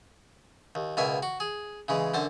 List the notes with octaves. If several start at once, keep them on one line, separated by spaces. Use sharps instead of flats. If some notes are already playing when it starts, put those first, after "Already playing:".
D#2
C#2 B2 A#3 E5 G#5
F#4
G#4
C#3 E3 G#3
F#2 D3 C5 A5